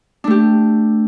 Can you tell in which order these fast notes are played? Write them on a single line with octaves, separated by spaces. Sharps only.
D4 A3 G4